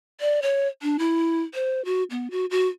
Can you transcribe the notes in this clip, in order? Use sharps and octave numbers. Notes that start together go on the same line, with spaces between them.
D5
C#5
D4
E4
C5
F#4
B3
F#4
F#4